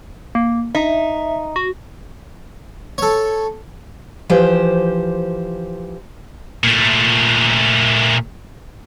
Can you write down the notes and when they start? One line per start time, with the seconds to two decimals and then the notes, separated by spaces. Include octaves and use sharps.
0.35 A#3
0.75 D#4 E5
1.56 F#4
2.98 A4 C#5
4.29 E3 F3 G4 C5
6.64 A#2 A3